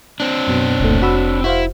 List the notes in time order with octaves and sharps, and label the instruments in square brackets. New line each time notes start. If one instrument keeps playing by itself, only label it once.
[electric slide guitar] C4 D4
[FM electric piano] F#2 B2
[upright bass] F1 [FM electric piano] C#2 A#2 A3
[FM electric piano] F#4 B5 E6
[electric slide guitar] E4 [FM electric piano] F#4 C5 F5